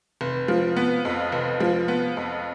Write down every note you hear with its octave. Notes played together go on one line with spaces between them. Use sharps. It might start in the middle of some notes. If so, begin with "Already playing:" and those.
F1
F3
B3
F2
F1
F3
B3
F2